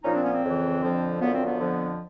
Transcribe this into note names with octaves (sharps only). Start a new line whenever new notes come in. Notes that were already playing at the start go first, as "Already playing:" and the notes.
A#2 F3 C#4 D#4
C4 D4
B3 C#4
C4
F2 C#3 E3
F2 D3 F3
F#2 D3 F3 B3
C4
B3
F2 D3 F3